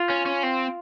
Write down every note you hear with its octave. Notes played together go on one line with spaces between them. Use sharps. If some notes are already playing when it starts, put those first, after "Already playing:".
Already playing: F4
C#4
C#4
C4